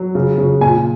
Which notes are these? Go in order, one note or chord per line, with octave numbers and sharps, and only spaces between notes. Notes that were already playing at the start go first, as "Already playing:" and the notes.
Already playing: F#3
C#3
C#3
A#2 G#5